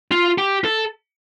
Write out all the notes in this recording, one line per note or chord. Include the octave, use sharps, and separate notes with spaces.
F4
G4
A4